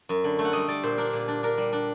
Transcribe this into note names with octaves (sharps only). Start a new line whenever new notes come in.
F#2
D3
A3
F#5
G3 D#5
G3 D5
A#2 C5
D4 A#4
A#2
D4
D4 A#4
G3
D4